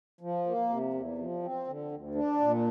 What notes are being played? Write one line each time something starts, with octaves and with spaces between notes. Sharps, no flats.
F3
A#3
C3
E2
F3
C4
D3
D2
D4
A#2